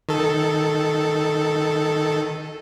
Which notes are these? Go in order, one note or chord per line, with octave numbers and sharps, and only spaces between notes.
D#3 A4